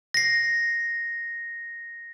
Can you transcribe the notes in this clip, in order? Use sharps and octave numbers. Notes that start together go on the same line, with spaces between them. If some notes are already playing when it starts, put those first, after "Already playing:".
A#6 C7